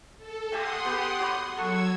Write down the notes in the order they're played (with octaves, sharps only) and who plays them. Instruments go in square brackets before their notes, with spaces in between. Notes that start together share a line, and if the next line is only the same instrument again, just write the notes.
[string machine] A4
[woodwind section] A3 A#3 [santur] G4 E5 G#5 [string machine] F#5 C6 D#6
[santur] B3 G#4 [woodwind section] G4
[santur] F#4 C#5 B5
[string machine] F#3 E6 G#6 [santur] A4 [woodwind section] F#5 C#6